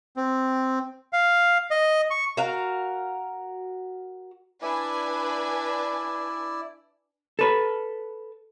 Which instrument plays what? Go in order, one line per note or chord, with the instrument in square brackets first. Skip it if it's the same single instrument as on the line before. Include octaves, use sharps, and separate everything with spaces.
[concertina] C4
F5
D#5
C#6
[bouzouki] F#4 A#4 F5
[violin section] D4 B4 G#5 [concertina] E4 D5
[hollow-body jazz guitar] A4 B4